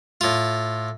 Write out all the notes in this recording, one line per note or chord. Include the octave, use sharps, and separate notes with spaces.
A2 F4